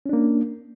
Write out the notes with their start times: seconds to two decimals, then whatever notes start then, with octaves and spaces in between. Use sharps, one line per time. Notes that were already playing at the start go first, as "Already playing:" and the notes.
0.06 C#4
0.09 D4
0.13 A#3